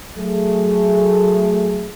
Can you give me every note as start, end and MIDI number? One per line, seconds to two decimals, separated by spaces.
0.17 1.90 54
0.17 1.90 57
0.17 1.90 68